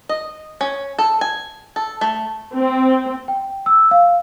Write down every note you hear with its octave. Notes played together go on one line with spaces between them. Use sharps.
D#5
C#4
A4
G#5
A4
A3
C4
G5
E6
F5